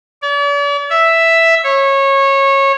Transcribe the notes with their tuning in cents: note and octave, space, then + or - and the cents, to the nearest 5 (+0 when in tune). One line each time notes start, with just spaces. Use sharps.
D5 -45
E5 +0
C#5 -20